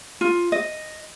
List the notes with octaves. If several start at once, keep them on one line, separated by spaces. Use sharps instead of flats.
F4
D#5